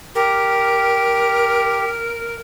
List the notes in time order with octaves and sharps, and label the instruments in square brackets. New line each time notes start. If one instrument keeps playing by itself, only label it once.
[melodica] G4 [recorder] A#4